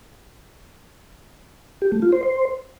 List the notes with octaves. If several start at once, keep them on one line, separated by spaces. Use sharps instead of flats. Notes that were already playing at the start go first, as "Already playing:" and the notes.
G4
A3
F4
C5
C5